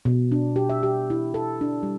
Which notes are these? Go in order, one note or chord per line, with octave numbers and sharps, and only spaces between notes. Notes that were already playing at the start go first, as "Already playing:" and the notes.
B2
D4
G4
E5
G4
E4
A4
D4
G3